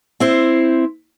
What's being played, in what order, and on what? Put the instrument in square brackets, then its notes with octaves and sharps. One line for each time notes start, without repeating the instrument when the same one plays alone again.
[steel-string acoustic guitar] C4 E4 C5